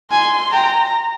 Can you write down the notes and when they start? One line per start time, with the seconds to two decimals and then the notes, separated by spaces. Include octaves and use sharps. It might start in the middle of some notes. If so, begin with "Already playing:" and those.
0.11 G#5 C6
0.53 G5 A#5